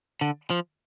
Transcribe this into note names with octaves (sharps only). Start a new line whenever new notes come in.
D3
F3